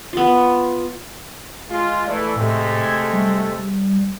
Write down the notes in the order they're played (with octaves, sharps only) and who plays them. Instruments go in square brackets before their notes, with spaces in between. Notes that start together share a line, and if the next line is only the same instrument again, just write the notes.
[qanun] B3 F4
[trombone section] G#3 F4
[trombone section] E3 A3 [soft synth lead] D5
[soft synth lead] A2 [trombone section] C3 G#3 A3
[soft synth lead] G#6
G3